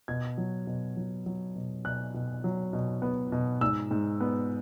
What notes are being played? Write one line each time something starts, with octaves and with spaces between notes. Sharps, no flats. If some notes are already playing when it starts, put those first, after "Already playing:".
B2 G#6
F#3
B2
F#3
F#3
B2
B2 F#6
B2
F#3
B2
B3
B2
G#2 E6
G#2
B3